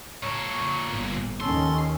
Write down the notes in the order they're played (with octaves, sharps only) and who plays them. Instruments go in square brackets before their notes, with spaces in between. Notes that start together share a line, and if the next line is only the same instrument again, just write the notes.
[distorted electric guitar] A#2 A4 [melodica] C#5 C#6
[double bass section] G1
[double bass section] D#2 D#3 C#4 [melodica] A4 [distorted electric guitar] C6